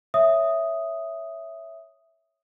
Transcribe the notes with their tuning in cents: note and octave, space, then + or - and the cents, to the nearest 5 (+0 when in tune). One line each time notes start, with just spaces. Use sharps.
C#5 +0 E5 +0 D#6 +0